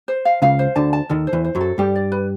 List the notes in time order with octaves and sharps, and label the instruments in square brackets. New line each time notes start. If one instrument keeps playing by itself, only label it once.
[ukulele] C5
F5
[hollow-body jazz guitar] C#2 C#3 [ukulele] F5
[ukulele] C5
[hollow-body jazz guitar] D2 D3 [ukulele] A5
[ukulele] A5
[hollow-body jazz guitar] D#2 D#3 [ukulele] A4
[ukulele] C5
[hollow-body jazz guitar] E2 E3
[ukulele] C5
[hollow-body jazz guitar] F#2 F#3
[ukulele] A4
[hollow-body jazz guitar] G2 G3 [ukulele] G4
[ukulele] D5
B4